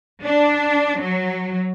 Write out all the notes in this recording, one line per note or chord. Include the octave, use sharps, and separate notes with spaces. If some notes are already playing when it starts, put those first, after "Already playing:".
D4
F#3